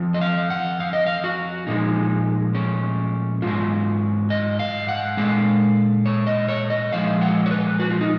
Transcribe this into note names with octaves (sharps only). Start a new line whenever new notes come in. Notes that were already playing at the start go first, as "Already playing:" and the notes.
Already playing: F2 F3
D#5
F5
F#5
F5
D#5
F5
F#4
A#2 F3 G#3 D#4
C#4
G#2 F#3 F4
D#5
F5
F#5
A#2 G#3 F5
C#5
D#5
C#5
D#5
A#2 F3 G#3 F5
F#5
C#5
B4
F#4
F4
D#4